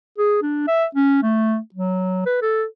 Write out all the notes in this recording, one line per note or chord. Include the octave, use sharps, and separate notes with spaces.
G#4
D4
E5
C#4
A3
F#3
B4
A4